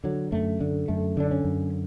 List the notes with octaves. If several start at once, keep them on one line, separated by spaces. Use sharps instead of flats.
D3 F#3
F#2 A3
D3
F#2 A3
D3 D4
C#4
F#2